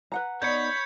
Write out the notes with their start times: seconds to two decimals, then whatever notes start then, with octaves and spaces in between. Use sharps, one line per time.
0.12 B4 F#5 A#5
0.42 B3 D#4 C#5 D5 B5 G6 G#6 C#7